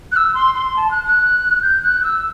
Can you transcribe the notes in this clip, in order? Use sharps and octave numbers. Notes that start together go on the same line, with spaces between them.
F#6
E6
C6
C6
A5
F#6
F#6
G6
F#6
E6